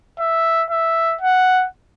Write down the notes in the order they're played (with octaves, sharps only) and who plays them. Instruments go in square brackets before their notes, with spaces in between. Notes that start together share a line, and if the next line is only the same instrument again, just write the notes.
[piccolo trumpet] E5
E5
F#5